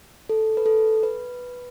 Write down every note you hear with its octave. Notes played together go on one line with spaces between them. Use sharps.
A4
B4
A4
B4